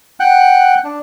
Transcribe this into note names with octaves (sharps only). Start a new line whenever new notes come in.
F#5 G5 F#6
D4